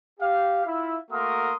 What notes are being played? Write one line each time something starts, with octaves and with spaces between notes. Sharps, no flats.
G4 F5
E4 F4 E5
A3 A#3 F#4 A#4 C6 D#6